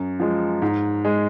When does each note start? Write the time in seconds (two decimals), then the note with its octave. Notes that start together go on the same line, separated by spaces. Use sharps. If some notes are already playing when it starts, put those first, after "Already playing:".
Already playing: F#2
0.20 F3 G#3
0.62 G#2
1.05 G#3